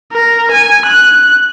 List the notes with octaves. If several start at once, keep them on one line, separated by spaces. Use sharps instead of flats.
A#4
G#5
F#6